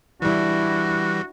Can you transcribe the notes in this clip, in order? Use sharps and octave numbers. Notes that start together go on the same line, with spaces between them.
E3 G3 D4 E4 F#4